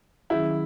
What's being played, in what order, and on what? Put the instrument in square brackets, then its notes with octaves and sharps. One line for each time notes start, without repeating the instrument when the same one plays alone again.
[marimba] D#3 F#3 C#4 G#4 [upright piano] E4